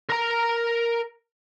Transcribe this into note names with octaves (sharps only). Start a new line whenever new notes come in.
A#4 A#5